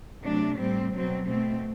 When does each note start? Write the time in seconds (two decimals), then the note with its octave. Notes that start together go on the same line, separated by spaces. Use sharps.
0.23 C3 F#3 A3 D4
0.58 A2 G3 C4
0.92 B2 F#3 C4
1.26 B2 A3 C4